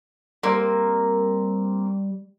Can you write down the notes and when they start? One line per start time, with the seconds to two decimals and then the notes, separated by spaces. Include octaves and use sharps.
0.43 G3 A#3 C4